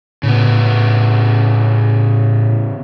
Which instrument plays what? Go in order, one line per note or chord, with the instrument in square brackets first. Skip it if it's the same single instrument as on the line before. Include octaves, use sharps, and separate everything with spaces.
[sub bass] A2 [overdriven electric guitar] C#3 B3